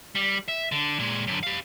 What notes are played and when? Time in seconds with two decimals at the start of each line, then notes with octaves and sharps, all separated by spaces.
0.15 G3
0.48 E5
0.72 D3
0.99 A#2 G#3
1.27 F#2 D3
1.43 G4 F5